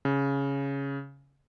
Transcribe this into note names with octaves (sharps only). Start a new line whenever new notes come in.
C#3